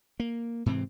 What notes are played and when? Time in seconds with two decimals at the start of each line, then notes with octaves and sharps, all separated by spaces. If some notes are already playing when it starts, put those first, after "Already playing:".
0.20 A#3
0.66 G#2 C3 E3 C4